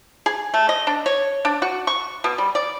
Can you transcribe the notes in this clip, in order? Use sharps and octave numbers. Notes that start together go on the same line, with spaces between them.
G#4
A3
D#5
D4
C#5
D4
F#4
C#6
B2
G3
D5